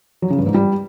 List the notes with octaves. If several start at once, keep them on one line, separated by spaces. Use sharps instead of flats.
F#3
C#3
G2
G#2
G3